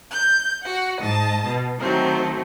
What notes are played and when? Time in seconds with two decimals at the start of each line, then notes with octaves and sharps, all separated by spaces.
0.11 G6
0.63 F#4 F#5
0.98 G#2 D#5 A5
1.46 B2
1.79 D#3 F#3 A3 C4